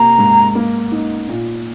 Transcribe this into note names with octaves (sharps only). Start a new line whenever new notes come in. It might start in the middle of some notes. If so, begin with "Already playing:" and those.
Already playing: C3 A#3 A#5
G#2
A#3
D#4
A#2